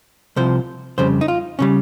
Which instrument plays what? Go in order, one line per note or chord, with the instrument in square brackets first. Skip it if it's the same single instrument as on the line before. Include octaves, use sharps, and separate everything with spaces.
[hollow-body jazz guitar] C2 C3 F3 C5
F2 C#3 G3 C5
D#4
F4
C#3 G3 C#4